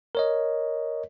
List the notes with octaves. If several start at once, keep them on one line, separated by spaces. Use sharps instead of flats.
A#4 C#5 D#5